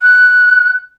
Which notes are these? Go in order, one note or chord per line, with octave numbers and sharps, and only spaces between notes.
F#6